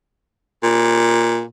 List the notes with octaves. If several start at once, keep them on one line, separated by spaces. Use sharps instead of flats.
A#2